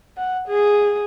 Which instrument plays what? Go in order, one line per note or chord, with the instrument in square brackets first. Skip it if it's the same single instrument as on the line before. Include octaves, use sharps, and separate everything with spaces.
[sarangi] F#5
G#4